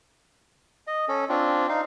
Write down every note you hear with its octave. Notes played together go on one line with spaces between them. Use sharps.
D#5
C#4 A4
C4 D4 F4
D#4 F5